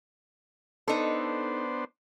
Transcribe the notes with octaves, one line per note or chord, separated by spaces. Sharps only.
B3 D4 D#4 A4 C5